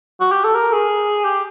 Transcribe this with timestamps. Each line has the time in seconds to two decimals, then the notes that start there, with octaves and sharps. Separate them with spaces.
0.21 F#4
0.32 G4
0.44 A4
0.55 A#4
0.73 G#4
1.24 G4